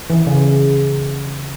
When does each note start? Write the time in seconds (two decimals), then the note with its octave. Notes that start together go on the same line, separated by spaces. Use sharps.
0.10 E3
0.27 C#3